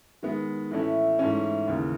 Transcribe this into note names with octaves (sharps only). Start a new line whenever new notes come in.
D#3 G#3 B3
A2 E3 A3 C#4 E4
G#2 E3 A3 C#4
D#2 C#3 E3